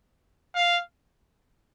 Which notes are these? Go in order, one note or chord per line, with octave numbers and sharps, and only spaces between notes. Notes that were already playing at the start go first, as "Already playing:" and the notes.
F5